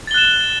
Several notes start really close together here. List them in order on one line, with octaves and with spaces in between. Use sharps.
A6 G7 F#6 E7